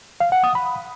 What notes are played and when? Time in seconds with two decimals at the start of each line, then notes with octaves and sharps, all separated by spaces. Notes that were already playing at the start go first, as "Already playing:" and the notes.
0.20 F5
0.32 F#5
0.44 D#6
0.55 B5